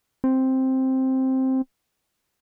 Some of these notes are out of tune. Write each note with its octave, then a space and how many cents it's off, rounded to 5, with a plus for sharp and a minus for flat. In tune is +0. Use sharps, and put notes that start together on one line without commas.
C4 +5